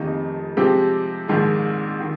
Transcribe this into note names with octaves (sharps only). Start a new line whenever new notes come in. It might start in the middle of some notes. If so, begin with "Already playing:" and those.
Already playing: F1 F2 D#3 A#3 D#4
C3 F3 G#3 C4 G4
A#1 G#2 D#3 G#3
D#3